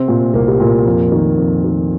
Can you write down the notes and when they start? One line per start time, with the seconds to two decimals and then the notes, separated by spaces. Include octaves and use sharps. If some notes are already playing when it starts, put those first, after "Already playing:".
Already playing: C3 C4
0.08 A#2
0.34 C2 A#3
0.48 G3
0.60 A#2 A#3
0.86 F2
1.12 D#3
1.38 F2
1.64 D#3